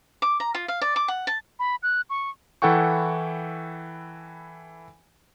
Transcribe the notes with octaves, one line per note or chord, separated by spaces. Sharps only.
D6
A#5
F4
F5
D5
D6
F#5
A5
B5
F#6
C#6
E3 E4 A4 F#5 G5 C#6